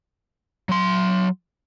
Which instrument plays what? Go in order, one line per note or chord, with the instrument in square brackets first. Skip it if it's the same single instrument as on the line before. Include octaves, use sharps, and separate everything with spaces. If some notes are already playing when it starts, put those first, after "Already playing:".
[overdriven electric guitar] F#3 C6